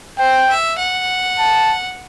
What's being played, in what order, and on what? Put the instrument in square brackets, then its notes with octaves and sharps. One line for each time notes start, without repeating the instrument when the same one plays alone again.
[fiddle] C5 [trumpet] G5
[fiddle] E5
F#5
[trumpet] A5